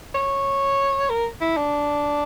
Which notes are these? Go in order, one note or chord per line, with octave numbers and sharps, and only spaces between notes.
C#5
A#4
E4
D4